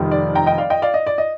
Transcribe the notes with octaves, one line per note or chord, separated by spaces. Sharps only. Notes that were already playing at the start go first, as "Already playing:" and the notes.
Already playing: F1 F2 D#3 G3
D5
G5 A#5
D#5 G5
D5 F5
D#5 G5
D5 F5
D#5
D5
D#5